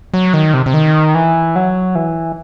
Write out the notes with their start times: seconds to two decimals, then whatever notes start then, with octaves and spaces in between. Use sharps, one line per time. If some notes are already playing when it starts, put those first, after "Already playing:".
0.14 F#3
0.34 D#3
0.54 C3
0.66 C3
0.74 D#3
1.15 E3
1.56 F#3
1.95 E3